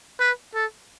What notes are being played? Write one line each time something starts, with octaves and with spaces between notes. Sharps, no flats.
B4
A4